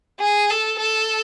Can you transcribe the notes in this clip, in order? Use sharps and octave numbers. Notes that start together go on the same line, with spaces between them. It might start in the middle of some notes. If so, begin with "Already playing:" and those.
G#4
A4
A4